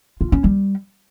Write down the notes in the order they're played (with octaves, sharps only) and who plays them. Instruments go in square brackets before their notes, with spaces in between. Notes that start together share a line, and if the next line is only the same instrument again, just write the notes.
[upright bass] F4
C#4
G3